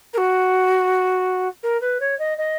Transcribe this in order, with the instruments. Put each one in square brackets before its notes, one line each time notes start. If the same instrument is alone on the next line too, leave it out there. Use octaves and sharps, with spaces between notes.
[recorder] A#4
F#4
A#4
B4
C#5
D#5
D#5